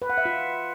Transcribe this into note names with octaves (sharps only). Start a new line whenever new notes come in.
B4
F#5
E5
F4